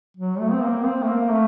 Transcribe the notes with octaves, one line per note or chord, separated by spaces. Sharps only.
F#3
A3
C4
A#3
C4
A3
A#3
A3